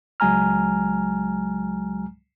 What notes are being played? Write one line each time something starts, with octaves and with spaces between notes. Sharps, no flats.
C#2 F#3 G#3 G#5 A#5 F6